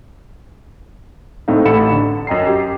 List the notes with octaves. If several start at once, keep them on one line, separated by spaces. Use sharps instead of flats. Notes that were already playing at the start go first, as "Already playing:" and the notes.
A2 A3 C4 D#4 F5
A1 A4 F#5 B5 C#7 E7
D3
F#2 D#5 G5 A#5 C7
G4